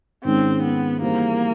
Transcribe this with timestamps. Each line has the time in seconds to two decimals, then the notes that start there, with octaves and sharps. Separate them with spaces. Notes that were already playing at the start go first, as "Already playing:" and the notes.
0.24 G#2 D#3 G#3 C4 C#4
0.63 B3
1.02 E3 G3 A#3 C4 D#4 G#4